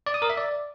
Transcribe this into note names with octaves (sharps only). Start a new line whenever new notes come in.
D5
D#6
A#4
E5
D5